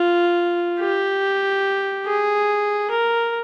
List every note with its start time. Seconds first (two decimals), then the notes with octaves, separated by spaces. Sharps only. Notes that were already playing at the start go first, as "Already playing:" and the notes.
Already playing: F4
0.80 G4
2.06 G#4
2.91 A#4